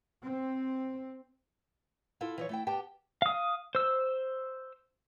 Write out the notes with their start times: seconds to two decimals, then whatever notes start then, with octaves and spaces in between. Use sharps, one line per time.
0.22 C4
2.21 E4 F4 A4 F5
2.38 E3 F3 C#5
2.49 A3 E4 G5
2.67 B3 G4 G5 A5
3.22 F5 D#6
3.75 C5 E6